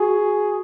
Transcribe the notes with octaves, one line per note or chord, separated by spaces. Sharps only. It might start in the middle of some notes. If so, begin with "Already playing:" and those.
Already playing: F#4 G#4